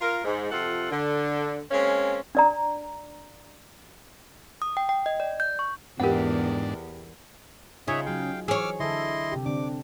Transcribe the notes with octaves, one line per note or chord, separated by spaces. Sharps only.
F4 A#4
G#2
F2 C3 F4 A4 F#5
D3
G#3 A#3 C4 C#4
D4 D5 A#5
D#6
G5
G5
D#5
D5
G6
C#6
E2 G#2 B3 D4 G4 A#4 F#5
C#3 D#4 F4 G#4 C#5 E5
F#3 G#4 F5 G5
E3 G#4 C#5 D6 E6 F6
D3 E4 A4 D#5 C6
C3 G4
D3 C4 D4 D6